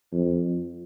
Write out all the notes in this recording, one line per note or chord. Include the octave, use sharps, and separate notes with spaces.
F2